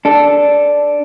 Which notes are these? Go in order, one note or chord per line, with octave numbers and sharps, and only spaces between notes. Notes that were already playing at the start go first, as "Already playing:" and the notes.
D4 A4